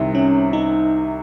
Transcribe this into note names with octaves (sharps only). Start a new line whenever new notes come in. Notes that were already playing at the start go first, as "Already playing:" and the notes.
Already playing: C2 C3 D#3
C#4
D#4